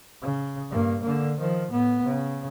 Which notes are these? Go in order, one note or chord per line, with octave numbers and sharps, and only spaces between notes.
C#3
G2 A#3
D3 A#3
D#3 F3
A2 B3
C#3